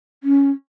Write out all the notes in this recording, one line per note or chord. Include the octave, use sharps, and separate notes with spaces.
C#4